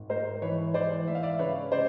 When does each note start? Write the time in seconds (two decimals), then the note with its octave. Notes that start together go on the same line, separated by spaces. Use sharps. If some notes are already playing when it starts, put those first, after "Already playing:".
Already playing: G#1
0.10 G#2 A#4 C5
0.42 E3 B4 C#5
0.74 E3 C5 D5
1.07 G#2 E5
1.15 F5
1.23 D5 E5
1.39 C#3 B4 C#5
1.72 C#3 C5 D5